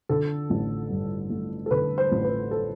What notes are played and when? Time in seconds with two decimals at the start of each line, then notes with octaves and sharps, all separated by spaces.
0.09 D3 A4
0.50 A1
0.90 G2
1.30 A3
1.66 A4
1.71 D3 B4
1.98 C5
2.12 A1
2.24 B4
2.51 A4